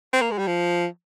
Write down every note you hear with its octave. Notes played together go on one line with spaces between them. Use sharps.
C4
A#3
G#3
G3
F3